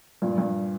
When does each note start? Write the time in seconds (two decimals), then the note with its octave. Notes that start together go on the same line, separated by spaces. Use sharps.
0.22 G2 A#2
0.38 G2